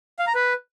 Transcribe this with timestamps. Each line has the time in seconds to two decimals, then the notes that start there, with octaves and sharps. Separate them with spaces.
0.19 F5
0.27 A#5
0.35 B4